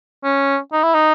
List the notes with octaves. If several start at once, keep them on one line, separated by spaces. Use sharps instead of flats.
C#4
D#4
E4
D#4